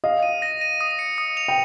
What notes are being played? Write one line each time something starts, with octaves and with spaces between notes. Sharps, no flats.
D#5 F5 D#6
D#7
A#6
D#7
D#6
C#7
D#6
F7
G5